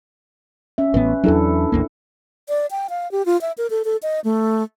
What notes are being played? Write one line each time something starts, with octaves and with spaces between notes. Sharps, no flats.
C#4 E5
A1 A2 B3 B4
E2 F#3 D4 E4 A4
A1 D#2 A#3
D5
G5
F5
G4
F4
E5
A#4
A4
A4
D#5
A3